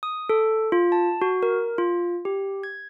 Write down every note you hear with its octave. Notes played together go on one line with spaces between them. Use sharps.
D#6
A4
F4
A5
F#4
A#4
F4
G4
G#6